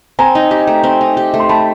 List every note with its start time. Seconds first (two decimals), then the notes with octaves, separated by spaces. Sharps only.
0.19 C4 G#5 A#5
0.35 D#4
0.51 G4
0.67 A3
0.83 C4
1.01 D#4
1.17 G4
1.34 A3
1.40 C6
1.49 A3 A5 B5